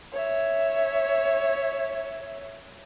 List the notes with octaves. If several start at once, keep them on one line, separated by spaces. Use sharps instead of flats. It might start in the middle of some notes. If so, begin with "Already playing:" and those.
C#5 E5